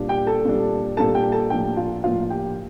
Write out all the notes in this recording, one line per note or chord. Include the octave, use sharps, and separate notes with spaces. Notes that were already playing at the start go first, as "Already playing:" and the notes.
Already playing: A#2 G3 D4
G4 G5
A4 A5
A#2 G3 D4
A#2 G3 D4 A4 A5
G4 G5
A4 A5
A2 F3 A#3 D4 G4 G5
F4 F5
A2 F3 A#3 D4 F4 F5
G4 G5